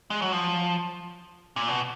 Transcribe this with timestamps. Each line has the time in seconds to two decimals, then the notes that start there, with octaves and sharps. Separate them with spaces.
0.10 G#3
0.22 F#3
0.32 F3
1.56 A#2
1.68 B2